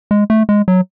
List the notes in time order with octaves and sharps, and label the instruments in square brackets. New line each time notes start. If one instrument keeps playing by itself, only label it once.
[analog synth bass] G#3
A3
G#3
F#3